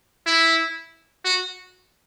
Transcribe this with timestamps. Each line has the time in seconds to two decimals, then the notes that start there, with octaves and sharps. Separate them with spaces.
0.27 E4
1.25 F#4